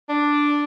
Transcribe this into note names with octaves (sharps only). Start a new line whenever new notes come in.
D4